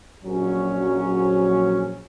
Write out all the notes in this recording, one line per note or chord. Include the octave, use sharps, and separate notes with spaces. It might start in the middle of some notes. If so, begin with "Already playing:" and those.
A#1 F#3 C#4